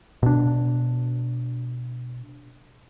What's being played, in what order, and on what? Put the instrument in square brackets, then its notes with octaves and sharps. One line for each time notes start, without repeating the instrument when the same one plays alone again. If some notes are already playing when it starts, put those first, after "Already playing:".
[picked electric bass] B2 D4